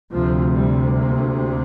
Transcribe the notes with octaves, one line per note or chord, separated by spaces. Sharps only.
D2 C3 F3
G3
A#3